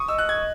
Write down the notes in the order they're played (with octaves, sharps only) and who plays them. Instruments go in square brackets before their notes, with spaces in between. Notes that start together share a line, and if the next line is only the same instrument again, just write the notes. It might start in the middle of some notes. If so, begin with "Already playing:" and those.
Already playing: [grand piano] C#6 D#6
[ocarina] D#5 [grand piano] E6
[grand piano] F#6
G#6